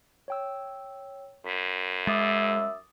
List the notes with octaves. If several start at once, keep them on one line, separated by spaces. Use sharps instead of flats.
C#5 G5 E6
F#2 B6
G#3 E5 D6 D#6 A6